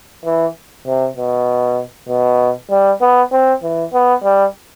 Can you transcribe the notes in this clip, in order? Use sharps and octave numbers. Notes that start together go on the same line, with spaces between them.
E3
C3
B2
B2
G3
B3
C4
E3
B3
G3